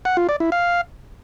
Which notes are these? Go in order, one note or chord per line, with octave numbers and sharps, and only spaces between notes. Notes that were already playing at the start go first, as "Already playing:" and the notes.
F#5
F4
D5
E4
F5